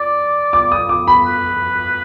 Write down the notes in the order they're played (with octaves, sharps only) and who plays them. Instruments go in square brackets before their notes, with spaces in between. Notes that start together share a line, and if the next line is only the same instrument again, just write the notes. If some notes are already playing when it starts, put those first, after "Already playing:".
Already playing: [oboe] D5 [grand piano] D6
[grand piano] D6
D#6
D6
B5
[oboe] B4